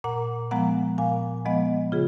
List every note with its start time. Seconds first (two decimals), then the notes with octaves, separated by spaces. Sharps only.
0.04 A#2 F#5 A#5
0.51 F3 G#3 B3 F#5 A#5
0.98 A#2 F5 G#5
1.46 F3 G#3 B3 D#5 F#5
1.92 C#3 F4 G#4